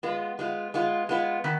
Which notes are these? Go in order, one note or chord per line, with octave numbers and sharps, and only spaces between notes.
G#3 B3 F4
G#3 B3 F4
G#3 B3 F4
G#3 B3 F4
D#3 B3